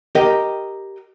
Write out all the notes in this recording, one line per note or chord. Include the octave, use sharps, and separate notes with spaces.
G4 A#4 D#5 G5